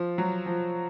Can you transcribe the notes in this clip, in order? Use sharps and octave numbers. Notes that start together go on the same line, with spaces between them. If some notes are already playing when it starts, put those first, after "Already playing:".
Already playing: F3
F#3
F3